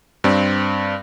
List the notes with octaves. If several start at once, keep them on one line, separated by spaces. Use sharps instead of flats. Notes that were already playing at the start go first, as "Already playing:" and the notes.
G2 C4 D5